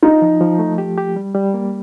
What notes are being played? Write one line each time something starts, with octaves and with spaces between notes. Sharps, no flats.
D#4 F4
F3
F3
A3
G4
G4
G3
G3
A#3